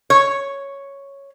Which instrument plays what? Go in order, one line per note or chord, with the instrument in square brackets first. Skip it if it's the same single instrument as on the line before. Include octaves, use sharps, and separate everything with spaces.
[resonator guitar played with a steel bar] C#5